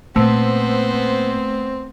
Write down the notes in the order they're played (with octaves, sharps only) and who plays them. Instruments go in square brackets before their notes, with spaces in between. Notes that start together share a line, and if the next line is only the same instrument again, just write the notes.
[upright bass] A#2 [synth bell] A3 [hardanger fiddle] B3 C5 [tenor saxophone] C4